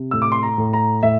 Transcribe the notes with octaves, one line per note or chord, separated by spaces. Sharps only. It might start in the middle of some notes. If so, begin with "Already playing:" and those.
Already playing: C3
A2 E6
D6
C6
A#5
A2
A#5
A2 E5